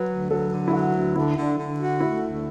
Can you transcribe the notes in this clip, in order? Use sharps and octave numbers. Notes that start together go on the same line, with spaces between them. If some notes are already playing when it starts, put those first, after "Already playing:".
Already playing: F#3 B4
D2
F#3 A4
D3
E4
F#3 F#4
D2
D3 E4
D3
D3
F#4
A3 E4
D2